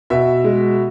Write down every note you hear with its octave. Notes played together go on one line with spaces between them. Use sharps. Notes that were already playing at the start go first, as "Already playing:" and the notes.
B2 E5
G#3